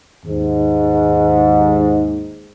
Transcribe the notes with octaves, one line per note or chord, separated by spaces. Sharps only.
D#2 G#2